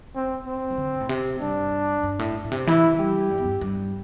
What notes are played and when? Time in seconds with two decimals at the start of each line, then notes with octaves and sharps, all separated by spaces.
0.16 C4
0.46 C4
0.71 E3
0.78 D3
1.00 A2
1.09 C3
1.41 G2 D4
2.03 G2
2.19 A2
2.44 A2
2.51 C3
2.67 E3 E4
2.99 G3 G4
3.30 G2
3.38 E2
3.45 G2
3.61 G2